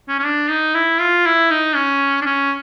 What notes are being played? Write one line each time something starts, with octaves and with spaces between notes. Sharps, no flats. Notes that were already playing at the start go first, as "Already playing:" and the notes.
C#4
C#4
D4
D#4
E4
F4
E4
D#4
C#4
D4
C#4